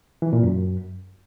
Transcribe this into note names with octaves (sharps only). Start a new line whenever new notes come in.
E3
A#2
F#2